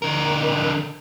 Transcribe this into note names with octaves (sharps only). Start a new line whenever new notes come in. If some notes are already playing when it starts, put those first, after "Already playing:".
D3 A#4